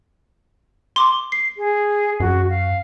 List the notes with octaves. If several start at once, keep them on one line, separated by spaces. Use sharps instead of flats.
C6 D6
C7
G#4
F#2 F#4
F5